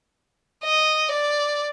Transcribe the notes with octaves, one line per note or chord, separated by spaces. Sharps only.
D#5
D5